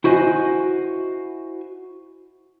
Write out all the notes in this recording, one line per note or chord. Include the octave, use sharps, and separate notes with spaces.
E4 F#4 C5 D#5 G#5